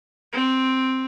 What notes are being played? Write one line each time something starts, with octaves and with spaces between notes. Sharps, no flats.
C4